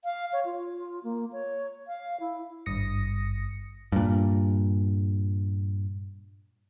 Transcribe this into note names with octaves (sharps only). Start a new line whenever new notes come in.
F5
C#5
F4
A#3
C#5
F5
E4
G#1 G2 D#6 A#6 C#7
G2 A#2